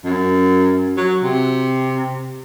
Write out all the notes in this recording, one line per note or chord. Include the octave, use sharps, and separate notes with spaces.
F#2
F#3
C3